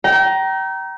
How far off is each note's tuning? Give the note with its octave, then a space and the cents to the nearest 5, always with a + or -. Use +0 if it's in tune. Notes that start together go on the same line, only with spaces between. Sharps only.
G5 -30 A#5 +15